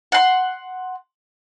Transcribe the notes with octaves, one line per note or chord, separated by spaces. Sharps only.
F#5 C6